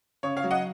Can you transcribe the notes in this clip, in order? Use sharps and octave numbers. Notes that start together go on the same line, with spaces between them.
C#3 C#5
C#5 F5
F#3
D#5 F#5